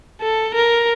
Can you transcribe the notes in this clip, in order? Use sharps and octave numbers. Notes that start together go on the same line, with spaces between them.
A4
A#4